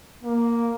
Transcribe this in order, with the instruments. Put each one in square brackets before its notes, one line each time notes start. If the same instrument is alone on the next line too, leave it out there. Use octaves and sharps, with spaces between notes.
[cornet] A#3